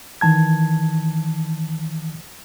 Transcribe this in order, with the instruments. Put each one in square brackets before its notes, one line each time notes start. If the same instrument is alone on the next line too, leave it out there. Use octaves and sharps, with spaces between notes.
[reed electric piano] D#3 E3 A5 G#6